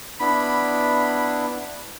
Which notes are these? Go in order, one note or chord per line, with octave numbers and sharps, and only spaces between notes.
B3 D4 E4 B5